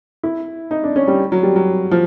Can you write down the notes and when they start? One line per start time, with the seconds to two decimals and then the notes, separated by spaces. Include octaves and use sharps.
0.23 E4
0.71 D#4
0.84 D4
0.96 C#4
1.08 G3
1.32 F#3
1.43 G3
1.56 F#3
1.91 F3